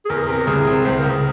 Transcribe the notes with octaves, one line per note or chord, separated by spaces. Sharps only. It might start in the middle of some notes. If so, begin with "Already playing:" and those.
G#4
E2 A#4
C3 A#4
C2 G#4
C4
C#2 C5
A#4
C#2
G#4